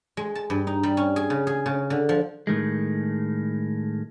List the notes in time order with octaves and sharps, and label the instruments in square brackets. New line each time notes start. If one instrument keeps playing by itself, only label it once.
[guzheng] G#3
A5
G2
D#4
G3
C#4
G#4
C#3
G#4
C#3
D3
F3
[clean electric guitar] A2 D#3 G#3